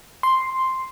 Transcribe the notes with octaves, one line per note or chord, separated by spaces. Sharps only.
C6